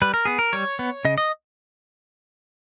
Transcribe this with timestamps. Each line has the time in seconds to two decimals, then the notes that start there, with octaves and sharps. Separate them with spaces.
0.02 G3 B4
0.14 A#4
0.25 B3 G#4
0.39 A#4
0.53 G3 C#5
0.79 B3
1.05 C#3 D#5
1.18 D#5